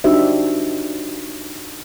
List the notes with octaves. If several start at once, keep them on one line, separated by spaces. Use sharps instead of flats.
D4 D#4 F#4 G4 C5 E5